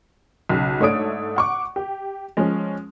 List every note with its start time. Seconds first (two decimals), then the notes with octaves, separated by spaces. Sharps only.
0.49 B1 C#3
0.80 G#2 A3 D4 C#5 D#6 D7
1.36 F#5 C#6 D6
1.76 G4
2.37 F3 G#3 C#4